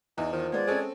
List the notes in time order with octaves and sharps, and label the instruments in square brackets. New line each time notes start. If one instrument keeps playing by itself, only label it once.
[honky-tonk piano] E2 [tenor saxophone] E3 [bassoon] D#4
[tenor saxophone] D#3 [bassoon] F3
[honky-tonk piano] G#3 B3 [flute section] D5 G#6
[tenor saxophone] G#3 [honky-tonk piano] C4 C#4 A4